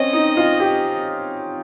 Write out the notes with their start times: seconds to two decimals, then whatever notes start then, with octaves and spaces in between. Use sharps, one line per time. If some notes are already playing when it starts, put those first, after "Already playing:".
Already playing: C4 C#4 D#5
0.13 D#4
0.37 F4
0.60 G4